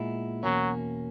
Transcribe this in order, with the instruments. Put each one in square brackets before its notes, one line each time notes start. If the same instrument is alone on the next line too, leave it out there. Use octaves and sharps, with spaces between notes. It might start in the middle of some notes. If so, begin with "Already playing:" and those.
Already playing: [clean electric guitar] A#2 G#3 B3 E4
[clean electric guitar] E2 B2 A#3 C#4 [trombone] F#3